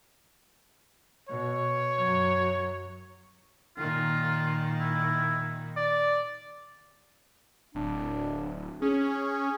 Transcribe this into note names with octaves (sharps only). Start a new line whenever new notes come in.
B2 C#5
F#2 F#3
A#2 D#3 F4
E4
D5
D1 D4
C#4 G#4